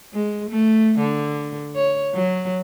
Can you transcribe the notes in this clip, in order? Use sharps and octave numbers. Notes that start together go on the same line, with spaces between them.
G#3
A3
D3
C#5
F#3